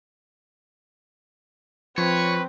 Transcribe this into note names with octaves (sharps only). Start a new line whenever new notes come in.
F3 C4 B4 C#5